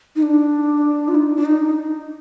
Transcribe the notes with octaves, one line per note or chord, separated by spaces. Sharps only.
D#4
D4
F4
D#4
D4
D#4